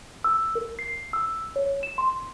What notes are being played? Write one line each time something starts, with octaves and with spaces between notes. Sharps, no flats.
E6
A#4
C7
E6
C#5
E7
C6